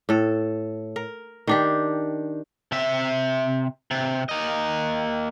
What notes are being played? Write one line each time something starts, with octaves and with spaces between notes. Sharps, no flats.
A2 A4
A#4
D#3 D4 G4
C3 E5
C3
A#3 D#5